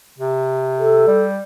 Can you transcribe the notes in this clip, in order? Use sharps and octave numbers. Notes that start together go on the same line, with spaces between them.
C3
A4
G3